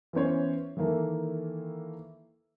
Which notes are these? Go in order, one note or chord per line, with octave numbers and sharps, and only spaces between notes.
E3 B3 C#4 C5 C#5
D#3 E3 A#3 E4 A4